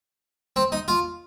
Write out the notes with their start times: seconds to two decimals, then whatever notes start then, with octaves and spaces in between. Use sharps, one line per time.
0.56 C4
0.72 D#4
0.88 F4